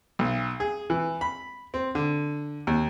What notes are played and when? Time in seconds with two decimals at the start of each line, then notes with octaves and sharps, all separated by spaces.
0.19 B1
0.60 G#4
0.90 E3
1.21 B5
1.74 C4
1.95 D3
2.67 D#2